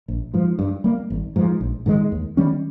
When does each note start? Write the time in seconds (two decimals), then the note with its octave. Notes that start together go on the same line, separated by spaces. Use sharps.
0.08 A#1
0.34 G#2 F3
0.59 G2
0.84 G3 A#3
1.10 G#1
1.36 G#2 F3
1.61 A#1
1.86 G#2 D#3 G#3
2.12 D#2
2.37 D#3 G3 C#4